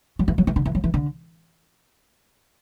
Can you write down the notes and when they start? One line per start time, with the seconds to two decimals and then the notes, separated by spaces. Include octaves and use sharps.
0.19 F#3
0.28 E3
0.38 F#3
0.47 E3
0.56 D3
0.66 E3
0.75 F#3
0.84 E3
0.94 D3